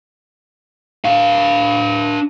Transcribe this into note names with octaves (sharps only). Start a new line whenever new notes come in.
D4 F5